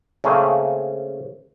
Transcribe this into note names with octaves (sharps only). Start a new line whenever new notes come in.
C#3 A3 A#3 C4 G#4